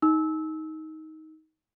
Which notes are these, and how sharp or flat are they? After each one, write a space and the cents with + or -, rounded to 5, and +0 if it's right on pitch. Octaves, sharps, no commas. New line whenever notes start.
D#4 +15 E6 -20